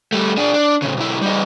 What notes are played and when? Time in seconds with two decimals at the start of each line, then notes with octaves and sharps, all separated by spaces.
0.12 G3 A3
0.37 D4 G#4
0.54 D4
0.82 A2 C#3
0.97 B1 E4
1.22 G3 D#4